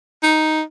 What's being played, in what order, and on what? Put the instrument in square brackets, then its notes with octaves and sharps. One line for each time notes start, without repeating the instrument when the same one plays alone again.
[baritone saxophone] D#4